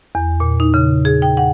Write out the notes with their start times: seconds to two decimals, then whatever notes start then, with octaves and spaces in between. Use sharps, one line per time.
0.15 E2
0.40 A#2
0.60 D#4
0.74 C#3
1.05 G#4
1.22 G5
1.37 F#5